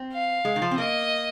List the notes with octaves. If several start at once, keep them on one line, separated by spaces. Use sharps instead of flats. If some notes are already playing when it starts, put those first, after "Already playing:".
Already playing: C4
F5
G#3
D#3
F3
C4
A#3 D#5